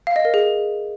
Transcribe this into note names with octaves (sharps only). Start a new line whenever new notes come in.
F5
D#5
A#4
G#4